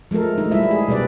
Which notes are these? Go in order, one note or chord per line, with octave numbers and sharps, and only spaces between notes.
F3 G#3 A3 A4 A#4
F3 A3 D#4
G3 G#3 E4 E5
G#4
B2 G3 B4 D5